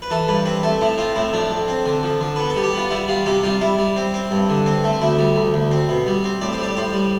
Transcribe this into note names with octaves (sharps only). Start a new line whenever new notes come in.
B4
E3 A4
G2 B4
C4 B4
A3 A4
A2 E4
C4 F4
A2 E4
F3 D4
F2
C4
D3
F3
D3
B3 B4
A4
G3
G4
B3 F4
G3 E4
G3 F4
C3 G4
G3 F4
G3 E4
G3
C4
C4
G2
D3
C4
A3
D2 E4
G3
D2
D2
C4
B2
G3
C4
A2 D5
C5
G3 D5
A2 C5
G3